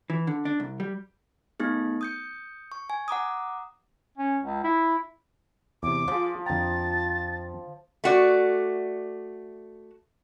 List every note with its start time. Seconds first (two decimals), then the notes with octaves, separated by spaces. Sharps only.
0.10 E3
0.27 D3
0.45 D4
0.60 C2
0.80 G3
1.60 A3 B3 D#4 G#4
2.01 D#6 G6 C#7
2.72 C#6
2.90 G#5
3.08 F#5 A#5 D6 D#6
4.18 C#4
4.43 C#2
4.64 E4
5.83 E2 C3 D6
6.08 F3 F4 G#4
6.46 F2 D3 G5 A#5 A6
8.04 A3 F#4 D5